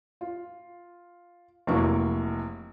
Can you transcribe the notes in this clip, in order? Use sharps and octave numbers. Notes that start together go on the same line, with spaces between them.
F4
F1 F#3 A#3 E4 C#6